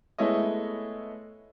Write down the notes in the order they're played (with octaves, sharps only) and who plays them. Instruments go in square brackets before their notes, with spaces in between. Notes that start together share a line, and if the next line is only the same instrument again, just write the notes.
[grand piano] G#3 A3 B3 E4 C#5 D#5